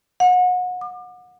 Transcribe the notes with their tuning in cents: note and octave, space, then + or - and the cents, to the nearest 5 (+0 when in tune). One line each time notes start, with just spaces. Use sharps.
F#5 -30
D6 +35